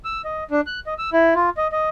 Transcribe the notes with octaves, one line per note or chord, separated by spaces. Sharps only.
E6
D#5
D4
F#6
D#5
E6
E4
F4
D#5
D#5